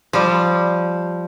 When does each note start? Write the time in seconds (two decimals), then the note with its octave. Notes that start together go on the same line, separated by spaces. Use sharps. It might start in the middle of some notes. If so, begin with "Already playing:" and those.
0.13 F3 G3